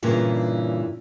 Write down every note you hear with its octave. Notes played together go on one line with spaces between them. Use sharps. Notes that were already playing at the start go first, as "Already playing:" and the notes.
G2 A#2 C#3 E3